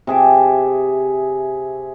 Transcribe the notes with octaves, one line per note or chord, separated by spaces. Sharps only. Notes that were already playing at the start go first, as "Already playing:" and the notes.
C3 G#4 E5 D6